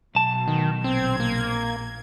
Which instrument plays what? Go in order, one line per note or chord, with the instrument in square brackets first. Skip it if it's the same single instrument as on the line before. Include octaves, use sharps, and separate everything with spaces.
[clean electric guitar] B1 A5 [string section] B2
[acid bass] D#3
[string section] A#1 G#6 [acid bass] C4
[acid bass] A#3